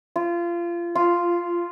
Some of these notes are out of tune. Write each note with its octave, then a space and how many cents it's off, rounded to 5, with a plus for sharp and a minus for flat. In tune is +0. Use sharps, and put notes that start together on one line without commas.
F4 -25
F4 -5